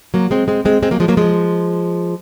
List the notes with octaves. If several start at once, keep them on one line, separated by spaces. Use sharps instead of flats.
F#3 A#3
G#3 C4
G#3 C4
G#3 C4
G#3 C4
F#3 A#3
F3 G#3
F#3 A#3
F3 G#3